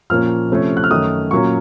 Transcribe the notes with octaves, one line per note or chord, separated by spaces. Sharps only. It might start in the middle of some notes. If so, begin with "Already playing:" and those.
A#2 F3 A#3 C#4 F6
C3 F3 A3 C#4
F#6
F6
F#2 D#3 A3 C#4 D#6
A#2 F#3 A#3 C#4 C#6